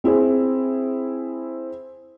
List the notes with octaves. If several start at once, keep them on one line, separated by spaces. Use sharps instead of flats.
C4 E4 G#4 C5